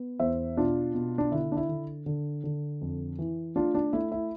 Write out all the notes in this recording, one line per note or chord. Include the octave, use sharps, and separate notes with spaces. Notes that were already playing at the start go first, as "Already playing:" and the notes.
Already playing: B3
E2 C5 E5
B2 D4 F4
B2
D4
D3 E4
D4
E4
D3
D3
D3
F2
E3
A3 D4 F4
D4
A3 E4
E4